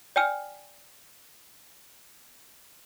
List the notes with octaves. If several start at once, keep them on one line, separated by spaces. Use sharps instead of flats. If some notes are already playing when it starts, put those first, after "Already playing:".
D5 G5 G#5 F6